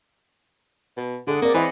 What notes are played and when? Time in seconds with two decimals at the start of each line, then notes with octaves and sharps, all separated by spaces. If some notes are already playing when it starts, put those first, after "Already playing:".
0.97 B2
1.27 D3 G#4 F#5
1.42 A#3 C4 D5
1.54 E3 C5 D#5 F#5